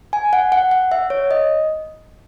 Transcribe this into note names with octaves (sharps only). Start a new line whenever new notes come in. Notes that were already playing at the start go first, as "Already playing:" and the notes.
G#5
F#5
F#5
F#5
E5
C#5
D#5